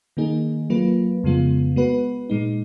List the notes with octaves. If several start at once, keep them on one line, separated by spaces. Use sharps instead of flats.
D#3 A#3 D#4 G#4
F#3 A#3 F4 B4
F2 C#3 G#3 B3 F4
G#3 B3 F#4 B4
A#2 G#3 D#4